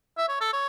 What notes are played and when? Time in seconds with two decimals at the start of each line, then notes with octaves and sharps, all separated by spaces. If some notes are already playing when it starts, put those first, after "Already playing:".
0.18 E5
0.29 C#5
0.41 A4
0.53 C#5